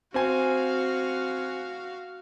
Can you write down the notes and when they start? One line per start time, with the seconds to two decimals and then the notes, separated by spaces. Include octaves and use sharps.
0.14 C4 F#4 F5 G#5